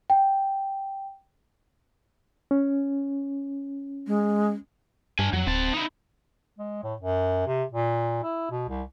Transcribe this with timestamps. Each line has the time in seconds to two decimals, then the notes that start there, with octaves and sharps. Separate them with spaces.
0.10 G5
2.51 C#4
4.07 G#3
5.19 G2 D4 G#5
5.33 F2 F#3
5.47 D1 C4 A5
5.73 D#4 E4
6.58 G#3
6.84 A2
7.01 F#2
7.46 C3
7.72 A#2
8.24 E4
8.51 B2
8.69 C2